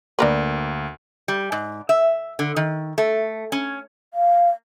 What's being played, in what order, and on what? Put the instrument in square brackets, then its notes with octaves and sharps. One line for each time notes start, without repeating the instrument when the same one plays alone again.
[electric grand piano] D2 A#3 [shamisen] D4 A#4 B4
[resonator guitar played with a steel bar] G3
G#2
E5
D3
D#3
A3
C#4
[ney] F5